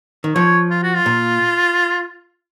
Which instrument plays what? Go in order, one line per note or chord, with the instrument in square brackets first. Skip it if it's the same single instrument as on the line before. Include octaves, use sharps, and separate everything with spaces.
[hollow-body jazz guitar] D#3
[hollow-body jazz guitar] F3 [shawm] C#5
[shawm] F4
F#4
F4
[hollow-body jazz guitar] A#2